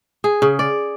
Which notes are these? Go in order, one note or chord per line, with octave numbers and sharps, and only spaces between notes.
G#4
C#3
D5